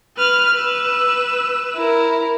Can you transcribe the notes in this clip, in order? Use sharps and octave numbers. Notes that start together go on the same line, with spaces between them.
B4 F6
B4 E6
E4 A#4